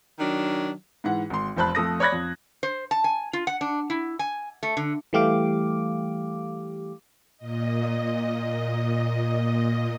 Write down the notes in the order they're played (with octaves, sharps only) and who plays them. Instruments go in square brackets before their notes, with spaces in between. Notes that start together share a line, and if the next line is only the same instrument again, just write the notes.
[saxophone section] D#3 F#3 D4
[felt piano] G#2 E3 F#5
G#1 C6
F1 F2 C5 A5 B5 F#6
F2 F3 A3 A4 D#6 A#6
C#5 D5 B5 F#6 G#6 A#6
F2
[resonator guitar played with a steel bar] C5
A5
G#5
F4
F#5
D4
E4
G#5
A3
D3
[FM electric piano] E3 G3 A3 G4 F5 D6
[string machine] A#2 D#5